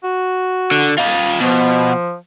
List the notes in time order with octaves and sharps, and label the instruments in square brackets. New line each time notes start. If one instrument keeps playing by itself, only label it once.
[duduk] F#4
[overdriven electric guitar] D3
F4 D#5
[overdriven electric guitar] B2 [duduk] F3